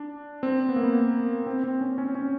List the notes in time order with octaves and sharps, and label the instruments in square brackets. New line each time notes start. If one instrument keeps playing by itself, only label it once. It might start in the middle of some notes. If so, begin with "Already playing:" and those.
Already playing: [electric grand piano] D4
C4
B3
A#3
B3
C4
C4
C#4
C#4
C#4